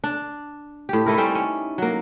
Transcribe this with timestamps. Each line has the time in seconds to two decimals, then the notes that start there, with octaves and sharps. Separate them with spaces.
0.04 D4
0.89 A2 G4
1.06 A3 D#4 E4 A#4
1.18 G3 C4 C#4
1.35 C#4
1.78 F#3 A#3